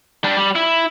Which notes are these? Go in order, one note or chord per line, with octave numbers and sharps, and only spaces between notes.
G3 D4
G3
E4